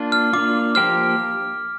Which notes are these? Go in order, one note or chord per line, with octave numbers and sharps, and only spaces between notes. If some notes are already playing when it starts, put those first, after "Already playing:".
Already playing: A#3 D4 F4
F6
A#3 D4 F4 D6
F3 A#3 G4 C5 F6